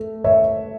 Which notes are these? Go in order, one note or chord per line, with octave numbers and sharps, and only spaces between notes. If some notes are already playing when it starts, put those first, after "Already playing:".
Already playing: A3
C#5 E5